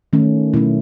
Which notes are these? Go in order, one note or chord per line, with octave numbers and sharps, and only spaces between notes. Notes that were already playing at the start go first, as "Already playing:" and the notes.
D#3 A3 C#4
B2 F#3 A3 C#4 E4